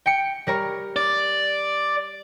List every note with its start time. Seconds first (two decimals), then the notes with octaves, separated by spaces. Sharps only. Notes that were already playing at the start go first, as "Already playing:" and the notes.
0.06 G5 C#7
0.47 G3 A#4 C#5
0.96 D5